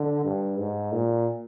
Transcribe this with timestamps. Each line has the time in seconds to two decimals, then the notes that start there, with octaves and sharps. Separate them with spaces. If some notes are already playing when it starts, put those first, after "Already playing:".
Already playing: D3
0.25 G2
0.58 G#2
0.92 A#2